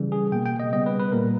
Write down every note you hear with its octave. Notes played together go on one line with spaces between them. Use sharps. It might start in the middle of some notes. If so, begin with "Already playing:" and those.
Already playing: C#3 E3 G3
G#4
B2 A#3 G5
G5
D#5
C#3 G3 B3 D#5
B4
B4
A#2 G3 A#3 A#4